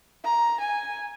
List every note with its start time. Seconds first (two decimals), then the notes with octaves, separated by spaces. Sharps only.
0.24 A#5
0.60 G#5